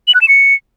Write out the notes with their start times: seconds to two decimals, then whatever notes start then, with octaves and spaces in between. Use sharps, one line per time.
0.08 F#7
0.15 F#6
0.21 E7
0.28 C#7